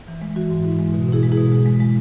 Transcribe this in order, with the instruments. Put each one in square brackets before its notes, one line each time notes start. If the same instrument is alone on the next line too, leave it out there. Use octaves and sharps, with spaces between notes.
[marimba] E3
G#3
E3 F#4
G#2
G#2 E4
G#3
B2 F#4
B2 E4 G#4
G#3
E4 G#4
B2
G#3
G#3
G#3